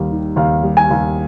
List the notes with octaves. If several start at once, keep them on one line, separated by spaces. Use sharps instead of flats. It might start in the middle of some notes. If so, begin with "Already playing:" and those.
Already playing: D#2 G3
D#3
D#2 F5
G3
G#5
D#2